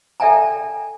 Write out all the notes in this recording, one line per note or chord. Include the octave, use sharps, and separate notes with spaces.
A4 D5 E5 G5 G#5 A#5